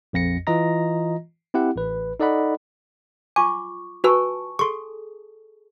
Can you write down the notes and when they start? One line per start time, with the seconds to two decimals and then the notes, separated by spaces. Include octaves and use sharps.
0.13 A#1 F2 A#6 C#7
0.47 E3 F4 D#5 A#5 A#6
1.54 C4 E4 G4 F#5
1.76 A1 B4
2.20 D#4 A4 D5 D#5 F#5 B5
3.36 F4 G#5 C#6 D6
4.04 F#4 B4 G#5 A5 C#6 E6
4.59 G#4 A4 C6 C#6